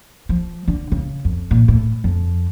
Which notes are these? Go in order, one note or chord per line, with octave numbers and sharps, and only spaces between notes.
F3
D3
C#3
F2
A#2
A2
F2